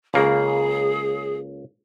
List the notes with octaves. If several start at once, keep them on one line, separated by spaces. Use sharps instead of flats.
C#2 C#3 A#3 G#4